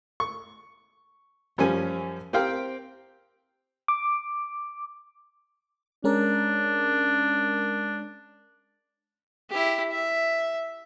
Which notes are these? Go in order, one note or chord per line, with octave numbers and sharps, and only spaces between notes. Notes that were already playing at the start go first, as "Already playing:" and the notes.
C#6
F#2 F3 G3 C#4 G#5
C4 G4 A#4 C5 F5 G5
D6
G#3 C#4 D4 A#4
E4 G4
E5